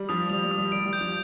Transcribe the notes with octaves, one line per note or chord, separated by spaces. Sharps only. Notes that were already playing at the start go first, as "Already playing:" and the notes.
Already playing: G3
F3 D#6
G3 F7
G3
D#6
G3
G3 D7
G3
G6
F3